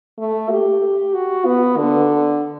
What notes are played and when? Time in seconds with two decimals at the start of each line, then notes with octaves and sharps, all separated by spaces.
0.19 A3
0.51 G4
1.14 F#4
1.45 B3
1.77 D3